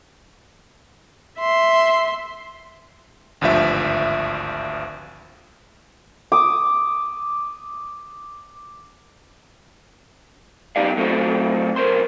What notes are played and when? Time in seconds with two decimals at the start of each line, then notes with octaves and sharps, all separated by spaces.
1.39 E5 C6
3.41 G#1 D2 G2 F3 E5
6.32 D6 D#6
10.76 F#3 B3 D#4 G4 D5 F5
10.97 F#3 A3 C4 F4 F#4
11.76 B1 F3 A#4 C5 C6